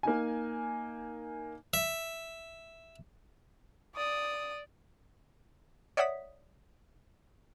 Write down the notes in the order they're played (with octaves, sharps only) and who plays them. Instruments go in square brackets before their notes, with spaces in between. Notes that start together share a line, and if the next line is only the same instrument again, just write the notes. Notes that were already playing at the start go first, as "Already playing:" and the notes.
[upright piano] A#3 D#4 G#5
[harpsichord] E5
[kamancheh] D5 D#6
[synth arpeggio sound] C#5 D5 E5 F#5 D#6 B6